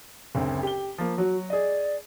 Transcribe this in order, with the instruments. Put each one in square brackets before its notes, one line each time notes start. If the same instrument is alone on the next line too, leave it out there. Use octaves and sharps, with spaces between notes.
[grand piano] F#1 D2 C4
G4 G7
F3 A#3
[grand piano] F#3 [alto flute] F#4
[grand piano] G#4 D#5 [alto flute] D5